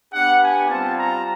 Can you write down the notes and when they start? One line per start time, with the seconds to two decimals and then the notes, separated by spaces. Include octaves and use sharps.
0.12 B3 D4 G4 F#5
0.41 G#5
0.69 G3 C4 F4 A5
0.97 A#5